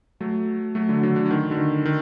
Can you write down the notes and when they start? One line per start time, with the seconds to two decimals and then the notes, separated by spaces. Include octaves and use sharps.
0.20 F#3 A3
0.75 F#3 A3
0.89 D3 F#3
1.03 D3 F#3
1.16 D3
1.26 F#3
1.31 D#3
1.51 D3
1.58 D#3
1.85 D#3